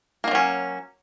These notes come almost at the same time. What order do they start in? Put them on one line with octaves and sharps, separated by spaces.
A#3 D#3 F#3 C#4